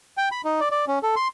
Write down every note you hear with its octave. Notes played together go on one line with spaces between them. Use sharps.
G5
B5
D#4
D5
D5
C#4
A4
C6